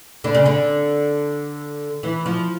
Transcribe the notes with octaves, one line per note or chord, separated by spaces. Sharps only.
D3
C#3
D3
E3
F3